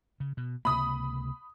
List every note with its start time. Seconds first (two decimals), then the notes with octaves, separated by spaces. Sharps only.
0.20 C#3
0.37 B2
0.65 C#2 C3 A#3 B5 D#6